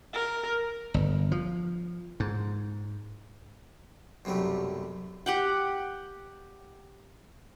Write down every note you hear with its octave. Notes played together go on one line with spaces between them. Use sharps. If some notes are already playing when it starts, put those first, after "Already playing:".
A#4
G1
F3
G#2
B1 F#2 C3 G3 A3
G4 F#5 G5